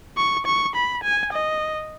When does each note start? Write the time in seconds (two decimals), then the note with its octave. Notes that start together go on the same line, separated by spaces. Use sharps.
0.17 C#6
0.46 C#6
0.75 B5
1.04 G#5
1.33 D#5